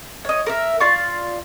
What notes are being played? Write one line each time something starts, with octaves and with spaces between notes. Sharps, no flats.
C#5 D#5
A#4 E5
F4 D5 F5 C#6